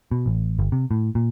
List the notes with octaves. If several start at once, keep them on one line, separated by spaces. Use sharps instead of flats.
B2
A1
G1
C3
A2
A#2